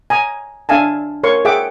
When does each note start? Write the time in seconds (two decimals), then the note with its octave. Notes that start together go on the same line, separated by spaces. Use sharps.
0.10 G#5 A#5 D#6
0.69 D4 E5 F5 G#5 A5
1.24 A#4 C#5 C6 C#6
1.45 G#4 E5 F#5 G5 D6